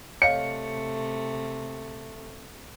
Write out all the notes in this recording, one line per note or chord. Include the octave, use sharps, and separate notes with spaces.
C3 A3 C#5 D#5 F5 C#7